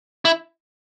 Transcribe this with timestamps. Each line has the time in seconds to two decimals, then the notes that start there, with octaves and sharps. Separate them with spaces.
0.25 E4